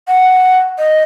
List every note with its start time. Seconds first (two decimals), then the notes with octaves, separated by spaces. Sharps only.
0.08 F#5
0.78 D#5